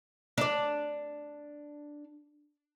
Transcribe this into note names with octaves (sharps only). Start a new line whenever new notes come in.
D4 D5